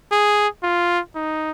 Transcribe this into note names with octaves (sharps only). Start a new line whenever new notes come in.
G#4
F4
D#4